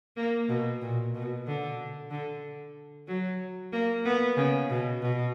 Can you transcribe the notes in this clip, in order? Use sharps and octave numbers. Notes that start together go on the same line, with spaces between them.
A#3
B2
A#2
B2
D3
D3
F#3
A#3
B3
C#3
B2
B2